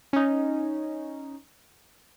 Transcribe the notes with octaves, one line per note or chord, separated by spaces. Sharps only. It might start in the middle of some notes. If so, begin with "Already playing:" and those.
C#4 D#4